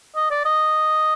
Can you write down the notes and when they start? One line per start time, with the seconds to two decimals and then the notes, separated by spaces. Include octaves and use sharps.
0.16 D#5
0.30 D5
0.45 D#5